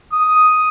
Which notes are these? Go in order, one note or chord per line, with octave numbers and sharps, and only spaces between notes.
D#6